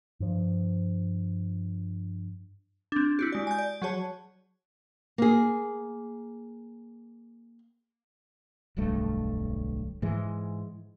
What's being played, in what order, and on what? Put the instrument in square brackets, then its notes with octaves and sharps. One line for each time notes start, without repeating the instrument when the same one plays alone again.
[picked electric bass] G2 F3
[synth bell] C4 D4
E4 F#4 G4
G#3 D5
G#5 G6
D5
F#3 F#4 G#4 C#5 A5
[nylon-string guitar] A#3 G#4
[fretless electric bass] D1 B1 G2 A3
G#2 E3 G#3